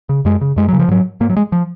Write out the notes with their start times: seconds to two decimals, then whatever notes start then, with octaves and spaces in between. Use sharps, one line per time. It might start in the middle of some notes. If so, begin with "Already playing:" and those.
0.09 C#3
0.25 F#2 G#3
0.41 C#3
0.56 F#2 G#3
0.68 C#3 F#3
0.79 F3
0.88 G#2 F#3
1.20 G#2 A#3
1.29 F#3
1.37 G#3
1.52 F3